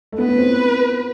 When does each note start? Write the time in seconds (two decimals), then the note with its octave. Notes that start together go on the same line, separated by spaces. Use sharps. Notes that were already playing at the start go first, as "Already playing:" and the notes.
0.12 A3
0.18 B3 B4
0.28 B3
0.38 C4